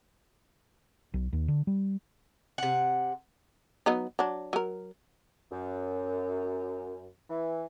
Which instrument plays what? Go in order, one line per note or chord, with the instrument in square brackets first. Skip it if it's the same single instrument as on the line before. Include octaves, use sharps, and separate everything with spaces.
[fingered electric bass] B1
D#2
D3
G3
[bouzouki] C3 F#5
[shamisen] F#3 B3 D#4
F#3 D4
F#3 A#4
[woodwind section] F#2
E3